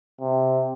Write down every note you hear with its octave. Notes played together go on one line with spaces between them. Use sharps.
C3